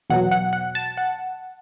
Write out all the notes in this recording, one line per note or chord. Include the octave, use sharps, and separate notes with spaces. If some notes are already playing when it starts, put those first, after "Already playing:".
E2 B2 F#3 F#5
F#5
F#5
A5
F#5